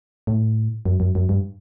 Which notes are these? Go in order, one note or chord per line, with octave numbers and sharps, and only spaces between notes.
A2
F#2
F#2
F#2
G2